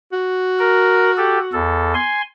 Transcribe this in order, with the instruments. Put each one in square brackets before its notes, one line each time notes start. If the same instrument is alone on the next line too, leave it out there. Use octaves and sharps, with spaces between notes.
[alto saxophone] F#4
[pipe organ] A#4
G4 A4
E2 A4
G#5 C6